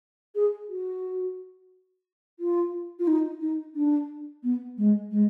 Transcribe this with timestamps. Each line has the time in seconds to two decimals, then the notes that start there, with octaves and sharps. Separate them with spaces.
0.35 G#4
0.69 F#4
2.40 F4
2.99 F4
3.07 D#4
3.41 D#4
3.75 D4
4.43 B3
4.78 G#3
5.11 G#3